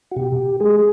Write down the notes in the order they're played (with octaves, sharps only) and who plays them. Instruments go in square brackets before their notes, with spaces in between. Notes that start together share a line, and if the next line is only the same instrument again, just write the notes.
[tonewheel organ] F#4
B2 G4
G#3 G#4